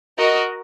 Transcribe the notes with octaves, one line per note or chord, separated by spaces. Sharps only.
F#4 A#4 D#5